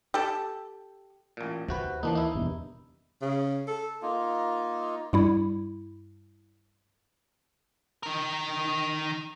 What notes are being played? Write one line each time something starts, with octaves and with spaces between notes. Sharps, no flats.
G4 A4
A1 A#2
D#2 C3 F#4 B4
E3 F3 A#3 D4 D#4
D#4 E4
E2 G2 B2 D3
C#3
A4
A#3 D#4 F4
G2 G3 E4
D#3 A#4